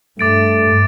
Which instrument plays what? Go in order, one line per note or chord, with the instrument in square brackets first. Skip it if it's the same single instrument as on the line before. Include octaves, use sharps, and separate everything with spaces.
[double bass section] G2 [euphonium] A3 [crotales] D6 A6 D7